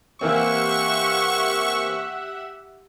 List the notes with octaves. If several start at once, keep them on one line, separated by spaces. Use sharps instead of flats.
E3 A#3 C4 G4 E5 F#5 C#6